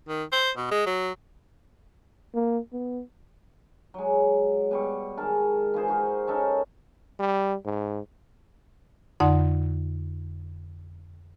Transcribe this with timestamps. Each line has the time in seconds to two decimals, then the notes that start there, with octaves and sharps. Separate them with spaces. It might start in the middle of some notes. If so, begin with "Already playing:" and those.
0.09 D#3
0.32 C5
0.57 B2
0.71 G#3
0.87 F#3
2.34 A#3
2.73 B3
3.94 F#3 G#3
4.71 B2 G3 C#6
5.17 D#3 G#3 A#4 A5
5.74 E3 F4 G#4 C5
5.88 D#4 F#4 A#4
6.27 C#4 D#4 A4 A#4
7.19 G3
7.65 G#2
9.20 F2 D3 D#4 D5 F#5 C6